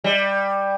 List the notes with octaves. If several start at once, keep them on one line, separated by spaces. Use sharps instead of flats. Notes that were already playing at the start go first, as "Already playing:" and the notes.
G3